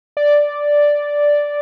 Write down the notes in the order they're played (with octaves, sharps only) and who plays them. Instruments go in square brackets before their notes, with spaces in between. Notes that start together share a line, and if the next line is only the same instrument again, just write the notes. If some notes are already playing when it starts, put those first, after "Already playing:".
[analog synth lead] D5